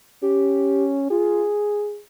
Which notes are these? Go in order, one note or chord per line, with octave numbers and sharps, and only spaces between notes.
C#4 G4
F4 G#4